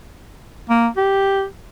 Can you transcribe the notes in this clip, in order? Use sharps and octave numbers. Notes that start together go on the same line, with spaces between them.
A#3
G4